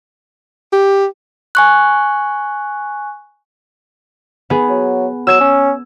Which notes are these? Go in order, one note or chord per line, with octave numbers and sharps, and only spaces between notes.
G4
G#5 C#6 F#6
B3 G#4
F#3
F#3 E6 G#6 E7
C#4